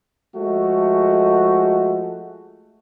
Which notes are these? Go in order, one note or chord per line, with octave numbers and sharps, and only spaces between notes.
F3 G#3 A3 F#4